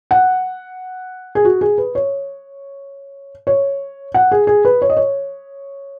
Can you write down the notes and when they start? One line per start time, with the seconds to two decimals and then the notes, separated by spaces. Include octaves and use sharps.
0.11 F#5
1.35 G#4
1.45 F#4
1.61 G#4
1.78 B4
1.95 C#5
3.47 C#5
4.14 F#5
4.32 G#4
4.47 G#4
4.65 B4
4.82 C#5
4.90 D#5
4.97 C#5